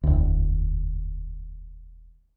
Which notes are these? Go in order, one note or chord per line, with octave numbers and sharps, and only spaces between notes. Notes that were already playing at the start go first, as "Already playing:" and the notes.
E1 D2